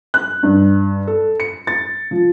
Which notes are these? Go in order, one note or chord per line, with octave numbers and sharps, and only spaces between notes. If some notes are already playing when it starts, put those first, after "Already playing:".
F#6
G2
A4
C#7
A6
F3